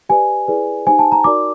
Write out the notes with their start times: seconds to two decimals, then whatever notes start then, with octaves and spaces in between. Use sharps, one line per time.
0.09 G4 B4 D5 G#5
0.48 E4 G#4 B4 D5
0.86 D#4 G4 C5 G#5
0.99 A5
1.12 A#5
1.24 D#4 F#4 A#4 D5 D6